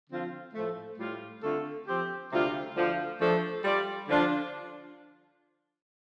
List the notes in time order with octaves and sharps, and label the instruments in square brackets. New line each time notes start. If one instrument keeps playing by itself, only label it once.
[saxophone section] D3 F3 C4 F4
A2 F3 A3
A2 G3 F4
D3 A3 C4 F4 A4
F3 C4 G4
D2 C3 G3 F4
D2 D3 F3
F3 A3 D4 A4 C5
G3 F4 D5
D3 F3 D4 F4